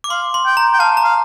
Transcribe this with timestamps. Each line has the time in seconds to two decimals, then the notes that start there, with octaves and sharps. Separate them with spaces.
0.04 D6
0.10 F5 C6
0.34 C6
0.46 G5
0.57 A#5
0.73 G5
0.79 F5 A5
0.97 A#5
1.04 F5